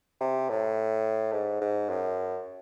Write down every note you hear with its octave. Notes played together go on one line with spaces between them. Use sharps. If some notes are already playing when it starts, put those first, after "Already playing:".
C3
A2
G#2
G#2
F#2